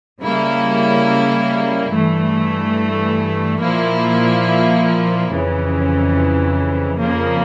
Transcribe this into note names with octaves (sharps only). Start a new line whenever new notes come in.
C#3 G3 A#3 E4
G2 E3 A3
A#2 F3 A#3 E4
F2 C#3 E3
F2 C#3 F3 A#3